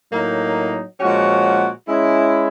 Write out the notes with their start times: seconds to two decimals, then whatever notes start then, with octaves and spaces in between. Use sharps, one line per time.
0.12 A2 F#3 A#3 D#4
0.99 A#2 F3 G#3 C#4 F#4
1.87 G#3 C#4 E4